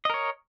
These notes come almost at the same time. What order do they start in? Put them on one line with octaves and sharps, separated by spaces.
D#5 A#4 C#5